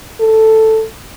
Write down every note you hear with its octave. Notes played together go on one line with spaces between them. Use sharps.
A4